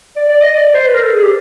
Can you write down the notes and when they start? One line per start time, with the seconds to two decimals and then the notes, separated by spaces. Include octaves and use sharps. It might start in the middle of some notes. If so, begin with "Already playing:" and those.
0.16 D5
0.29 D5
0.42 D#5
0.55 D5
0.74 C5
0.87 B4
0.94 A#4
1.03 A4
1.13 G#4
1.23 G4